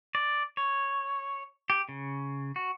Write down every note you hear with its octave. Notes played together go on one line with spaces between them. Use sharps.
D5
C#5
G4
C#3
F#4